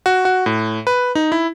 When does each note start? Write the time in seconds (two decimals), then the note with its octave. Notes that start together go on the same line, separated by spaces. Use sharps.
0.06 F#4
0.25 F#4
0.46 A2
0.87 B4
1.15 D#4
1.32 E4